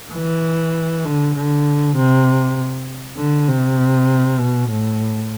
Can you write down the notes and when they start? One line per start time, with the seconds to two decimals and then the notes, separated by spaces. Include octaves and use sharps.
0.14 E3
1.06 D3
1.35 D3
1.96 C3
3.17 D3
3.48 C3
4.40 B2
4.70 A2